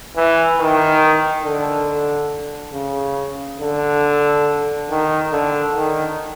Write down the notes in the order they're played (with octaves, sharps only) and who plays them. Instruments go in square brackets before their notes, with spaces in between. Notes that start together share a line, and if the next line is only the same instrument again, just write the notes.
[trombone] E3
D#3
D3
C#3
D3
D#3
D3
D#3